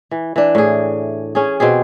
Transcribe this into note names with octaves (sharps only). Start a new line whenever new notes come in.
E3
E3 D4
A2 G#4
C#4 G#4
B2 C4 G4 G#4